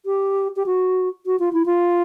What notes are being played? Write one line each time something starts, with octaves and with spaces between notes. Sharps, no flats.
G4
G4
F#4
F#4
F4
E4
F4